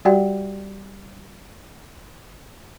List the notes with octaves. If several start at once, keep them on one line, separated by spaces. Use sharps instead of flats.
G3 F#4 G4 D5 F#5 G5